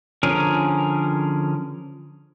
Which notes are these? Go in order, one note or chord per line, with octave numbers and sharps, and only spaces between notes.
D3 F3 C#4 G#4 A#4